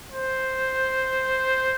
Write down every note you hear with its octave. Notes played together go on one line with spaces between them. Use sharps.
C5